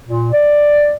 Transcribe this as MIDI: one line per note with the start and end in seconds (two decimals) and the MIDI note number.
0.06 0.28 46
0.32 0.93 74